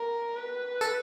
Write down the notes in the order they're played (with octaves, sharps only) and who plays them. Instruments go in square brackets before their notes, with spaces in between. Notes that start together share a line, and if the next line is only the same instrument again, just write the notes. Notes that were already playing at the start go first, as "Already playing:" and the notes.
Already playing: [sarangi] A#4
B4
[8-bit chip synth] A4